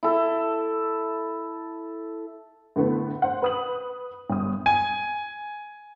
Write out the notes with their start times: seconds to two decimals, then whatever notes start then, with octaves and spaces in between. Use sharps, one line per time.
0.03 E4 A4
2.76 A2 D3 A3 B3
3.22 C5 F#5
3.42 B4 D#6 F#7
4.30 G1 D#6
4.66 G#5